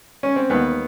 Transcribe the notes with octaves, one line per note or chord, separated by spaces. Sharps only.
C#4
C4
D#2 B3